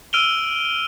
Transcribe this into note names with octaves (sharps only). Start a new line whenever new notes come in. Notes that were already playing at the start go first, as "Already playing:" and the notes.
E6 F6 D7 D#7 F7 G7